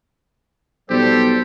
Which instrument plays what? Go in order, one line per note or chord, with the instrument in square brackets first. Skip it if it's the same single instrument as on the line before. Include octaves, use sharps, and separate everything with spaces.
[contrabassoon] B1 [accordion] G3 A4 C5 [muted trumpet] G4